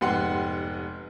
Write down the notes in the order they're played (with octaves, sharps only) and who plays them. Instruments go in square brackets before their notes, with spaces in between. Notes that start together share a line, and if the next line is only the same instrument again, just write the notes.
[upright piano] F1 G#2 B3 G4 F#5 C6